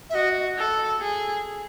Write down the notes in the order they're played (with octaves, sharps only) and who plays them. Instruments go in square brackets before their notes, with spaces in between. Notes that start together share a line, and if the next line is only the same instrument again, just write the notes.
[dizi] E5
[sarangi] F#4 [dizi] D#5
[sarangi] A4
G#4